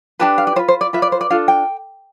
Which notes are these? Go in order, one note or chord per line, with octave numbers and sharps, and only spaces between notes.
D4 G4 B4 A5
F5
D5
F4 B4 C5
C5
D5
F4 B4 E5
D5
C5
D5
D4 F4 A4 F5
G5